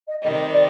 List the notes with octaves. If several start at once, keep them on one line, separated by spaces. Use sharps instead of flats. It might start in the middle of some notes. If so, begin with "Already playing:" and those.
D#5
C3 D#3 G3 D#5
D5